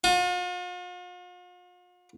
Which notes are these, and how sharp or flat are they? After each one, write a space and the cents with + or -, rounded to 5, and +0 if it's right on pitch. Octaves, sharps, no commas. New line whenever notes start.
F4 +45